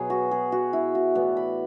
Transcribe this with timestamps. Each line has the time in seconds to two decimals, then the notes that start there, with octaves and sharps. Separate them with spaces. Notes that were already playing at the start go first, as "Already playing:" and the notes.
Already playing: B2 F#3 B3 G#4
0.10 F#4
0.31 G#4
0.52 F#4
0.73 E4
0.95 F#4
1.15 A2 E3 B3 D5
1.37 B5